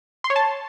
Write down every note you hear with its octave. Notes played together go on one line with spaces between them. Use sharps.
C6
C#5
A5